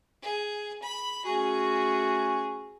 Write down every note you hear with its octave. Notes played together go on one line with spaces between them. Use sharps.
G#4
B5
A3 C#4 F#4 G#4